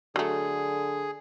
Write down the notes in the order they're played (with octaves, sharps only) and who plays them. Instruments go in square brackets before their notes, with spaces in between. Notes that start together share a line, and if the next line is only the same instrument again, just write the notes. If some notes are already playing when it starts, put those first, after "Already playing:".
[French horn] D3 [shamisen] F#3 A3 [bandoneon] G#4